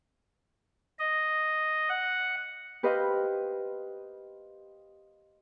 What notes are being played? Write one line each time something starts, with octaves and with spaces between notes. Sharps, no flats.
D#5
F#5
G4 B4 C5 D#5 F5